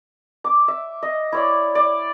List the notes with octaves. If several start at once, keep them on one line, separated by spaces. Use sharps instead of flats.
D6
E5
D#5
E4 C#5 D5
D5